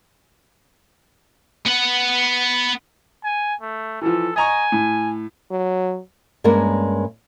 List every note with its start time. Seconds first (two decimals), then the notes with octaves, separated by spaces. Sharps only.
1.66 B3 F#5
3.24 G#5
3.61 A3
4.01 E3 F3 A4
4.36 D#5 G#5 A#5 C#6
4.72 A2
5.51 F#3
6.44 G2 G#3 A#3 C#4 A#4